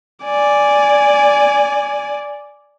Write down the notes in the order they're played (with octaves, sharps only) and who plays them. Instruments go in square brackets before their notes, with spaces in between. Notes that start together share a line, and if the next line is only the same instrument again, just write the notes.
[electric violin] D5 G#5